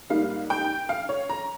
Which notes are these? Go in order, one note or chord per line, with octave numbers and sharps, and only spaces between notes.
G#2 G3 A#3 D#4 F5
G5
F5
C#5
A#5